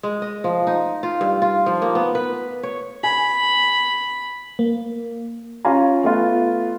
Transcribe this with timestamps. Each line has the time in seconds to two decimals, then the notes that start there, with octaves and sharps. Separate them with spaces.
0.03 G#3
0.22 D#5
0.44 F3
0.67 D#4
1.03 F4
1.21 G2
1.42 F4
1.66 F3
1.82 A#3
1.95 B3
2.15 B4
2.63 C#5
3.03 G#5 B5
4.59 A#3
5.65 C#4 F4 F5 G#5 A#5
6.04 A3 B3 F4